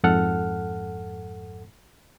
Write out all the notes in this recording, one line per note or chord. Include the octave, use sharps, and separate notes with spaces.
F2 G#2 A4 F#5 F6